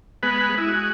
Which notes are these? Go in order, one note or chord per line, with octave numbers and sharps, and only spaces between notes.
G#3 B3 B4
G#3 E4
F#4